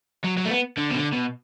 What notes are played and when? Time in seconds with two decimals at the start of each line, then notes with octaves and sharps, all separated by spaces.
0.25 F#3
0.38 F#3
0.45 A3
0.51 B3
0.78 D3
0.91 B2
0.95 D3
1.13 B2